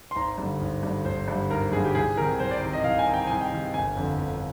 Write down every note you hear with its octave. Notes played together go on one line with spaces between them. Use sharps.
C6
G#1 A#5
G2 D3
G#1
G2 D3
G#1 C5
G2 D3
G#1 A#4
G2 D3 G#4
G4
C2 G#4
C3 D#3 A#4
C2 C5
D5
C3 D#3
D#5
C2 F5
G#5
C3 D#3
G5
C2 G#5
G5
C3 D#3
G1 G#5
F2 D3
G1